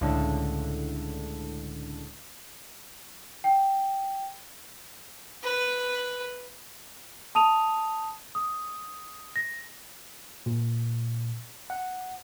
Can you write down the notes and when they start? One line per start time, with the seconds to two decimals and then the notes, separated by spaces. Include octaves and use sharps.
0.01 C#2 A2 D3
3.44 G5
5.43 B4
7.35 A5 D#6 D#7 F7
8.35 D#6
9.36 A#6
10.46 A#2
11.70 F#5